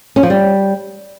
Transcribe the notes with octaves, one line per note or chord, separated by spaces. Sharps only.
C#4
F3
G3